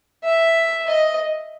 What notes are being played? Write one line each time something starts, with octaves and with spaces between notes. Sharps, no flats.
E5
D#5